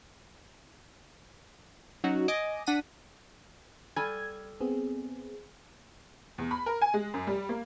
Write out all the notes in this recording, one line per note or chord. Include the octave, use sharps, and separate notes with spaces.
F#3 C#4 D#4 F#4
D#5 G#5 D6
D4 F#5 A#6 B6 D#7
G3 A4 G#5 G#6
B3 C4 G#4
E2
B5
A#4
G#5
G#3
F#2
G3
A#3